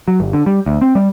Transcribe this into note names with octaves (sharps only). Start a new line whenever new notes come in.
F#3
G1
D3
G3
D2
C4
G3